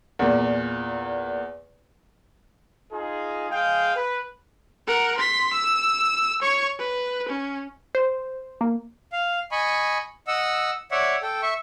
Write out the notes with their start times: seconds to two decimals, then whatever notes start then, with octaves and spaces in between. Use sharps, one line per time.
0.19 E2 A#2
2.92 D#4 F4 G#4
3.49 G#3 G#4 F5 G5
3.94 B4
4.87 A#4 F#5
5.17 C6 B6
5.53 E6
6.42 C#5 C#6
6.79 B4
7.29 C#4
7.95 C5
8.61 A#3
9.12 F5
9.52 D#5 G#5 B5 C#6
10.27 D#5 F#5 E6
10.91 C#5 D5 E5 F#5
11.22 A4 G5
11.43 E5 C#6